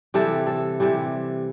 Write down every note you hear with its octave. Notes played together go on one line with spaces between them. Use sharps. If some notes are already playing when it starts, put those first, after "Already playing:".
C3 E3 G3 A4
A4
C3 E3 G3